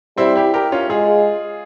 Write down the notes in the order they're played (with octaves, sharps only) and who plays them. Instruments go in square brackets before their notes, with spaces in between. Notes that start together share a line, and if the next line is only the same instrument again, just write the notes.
[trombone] G3 [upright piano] C4 E4
[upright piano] E4 G4
G4 A#4
C#4 F4
[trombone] G#3 [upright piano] F4 G#4